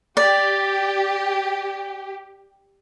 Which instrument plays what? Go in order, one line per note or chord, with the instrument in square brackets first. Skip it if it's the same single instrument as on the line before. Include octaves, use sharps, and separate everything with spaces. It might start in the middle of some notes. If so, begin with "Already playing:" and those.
[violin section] G4 [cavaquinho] D5